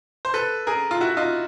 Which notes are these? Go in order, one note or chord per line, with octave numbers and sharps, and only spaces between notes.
C5
A4 B4
G#4 A#4
F4
E4 F#4
D#4 F4